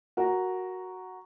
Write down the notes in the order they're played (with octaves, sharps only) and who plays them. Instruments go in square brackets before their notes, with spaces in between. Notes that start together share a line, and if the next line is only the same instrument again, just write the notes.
[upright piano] F#4 A#4